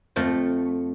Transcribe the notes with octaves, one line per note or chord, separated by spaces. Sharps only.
F2 F3 A3